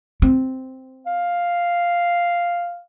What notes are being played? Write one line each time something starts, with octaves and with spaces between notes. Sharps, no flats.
C4
F5